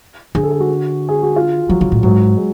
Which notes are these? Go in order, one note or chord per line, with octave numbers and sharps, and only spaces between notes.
D3 G#4
A4
G#4
F#4
G#4
F#4
F4
F3 F#3
C#3
A2
G#2 F#3
G#3